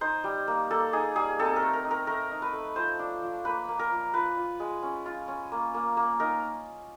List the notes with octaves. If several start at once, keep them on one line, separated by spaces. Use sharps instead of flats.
D#4 C5
G3
A#3
A#3 A4
D#4 G#4
G3 G#4
C4 A4
A#4
A3
A#4
D#4
A#4
A3 A#4
D#4
B4
A3
F3 C5
D4
F3
A#3 B4
A#3
A#4
F3
F4 B4
F4
G#3
C#4
F4
C#4
A#3
A#3
A#3
D#4 A#4